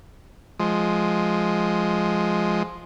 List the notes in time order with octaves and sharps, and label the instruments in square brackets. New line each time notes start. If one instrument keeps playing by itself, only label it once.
[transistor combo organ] F3 G#3